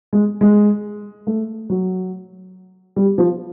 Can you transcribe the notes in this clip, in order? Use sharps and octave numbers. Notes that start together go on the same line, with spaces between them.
G#3
G#3
A3
F#3
G3
F3